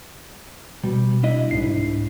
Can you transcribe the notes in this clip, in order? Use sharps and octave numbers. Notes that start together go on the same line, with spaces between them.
B2 G3
D4 E4 D#5
C2 G#2 C7